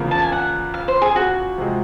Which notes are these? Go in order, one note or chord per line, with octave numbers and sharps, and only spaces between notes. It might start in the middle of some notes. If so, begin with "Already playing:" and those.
Already playing: E2 C#3 F3 A#3
A5
G#5
F#5
F5
C5
G#4
F#4
C3 F3 G#3